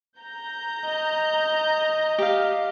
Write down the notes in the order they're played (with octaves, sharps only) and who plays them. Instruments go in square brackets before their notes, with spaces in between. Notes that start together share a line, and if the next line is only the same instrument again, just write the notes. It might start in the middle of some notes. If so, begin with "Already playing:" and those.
[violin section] A#5 G6
[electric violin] D#5
[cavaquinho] G4 F5